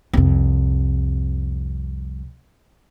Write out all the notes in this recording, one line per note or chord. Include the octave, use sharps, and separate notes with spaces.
C2 F2